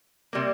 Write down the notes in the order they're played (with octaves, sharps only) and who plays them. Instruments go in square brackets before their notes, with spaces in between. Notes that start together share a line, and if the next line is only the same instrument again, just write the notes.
[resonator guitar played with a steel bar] C3 G3 A#3